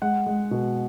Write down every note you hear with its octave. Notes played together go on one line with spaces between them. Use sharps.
G#3 F#5
G#3
B2